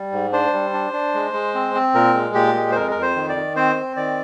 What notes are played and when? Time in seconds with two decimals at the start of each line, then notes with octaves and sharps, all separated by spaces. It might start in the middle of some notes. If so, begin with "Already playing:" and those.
Already playing: G3
0.12 G#2
0.33 D4 C5
0.53 G3
0.73 D4
0.93 D4
1.14 G#3
1.33 G#3
1.55 C4
1.75 C4
1.95 A#2 A#4
2.14 G#3
2.34 A#2 G4
2.54 G#3
2.72 C5
2.76 F2 A#4
2.91 F2 A#4
3.02 C5
3.16 D#3
3.29 D5
3.36 D#3
3.56 C4 C5
3.76 C4
3.96 D#3 D5